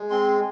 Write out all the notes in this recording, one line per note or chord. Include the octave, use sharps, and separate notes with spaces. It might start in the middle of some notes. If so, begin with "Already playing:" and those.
Already playing: G#3
C4 C6